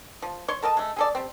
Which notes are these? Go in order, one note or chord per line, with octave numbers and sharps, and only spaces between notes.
F3
C#5 C6 C#6
A4 A#4 D#5 A5
G#3 A3
G#4 A4 D5
G3 C4